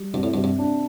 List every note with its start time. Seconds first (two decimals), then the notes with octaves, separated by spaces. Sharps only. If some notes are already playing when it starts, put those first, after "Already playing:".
Already playing: G3
0.14 G2 C3
0.23 A2
0.34 G2
0.37 C3
0.44 G2
0.59 D4